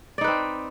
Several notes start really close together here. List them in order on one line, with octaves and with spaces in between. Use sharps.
D5 D#4 B4 C4